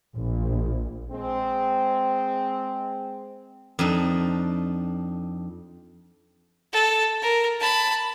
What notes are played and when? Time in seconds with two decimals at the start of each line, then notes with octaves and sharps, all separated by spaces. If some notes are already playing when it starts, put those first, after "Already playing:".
0.14 A#1
1.11 G#3 C4
3.79 F2 D4 D#4
6.73 A4
7.22 A#4
7.61 A5 B5